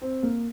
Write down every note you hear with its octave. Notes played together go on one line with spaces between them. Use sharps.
C4
A#3